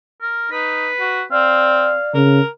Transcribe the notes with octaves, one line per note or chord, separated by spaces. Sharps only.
A#4
D#4 B4
F#4
C4 D5 F5
C#3 A#4